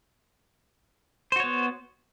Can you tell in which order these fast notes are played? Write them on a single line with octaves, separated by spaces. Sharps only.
C5 F#4 C#5 B3